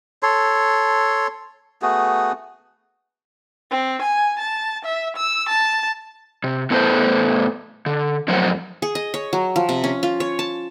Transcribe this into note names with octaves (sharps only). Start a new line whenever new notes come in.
A4 C#5 C6
A3 B3 F#4 G#4
C4
G#5
A5
E5
E6
A5
C3
A2 B3 A4 B4 C5
D3
F2 A2 F#3 A#4 C5 F#5
G#4
D#5
C#5
F#3
F3
C3
C#4
F4
C#5
A5